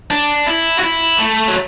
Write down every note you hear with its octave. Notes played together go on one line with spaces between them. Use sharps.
D4
E4
F#4
E4
A3
F#3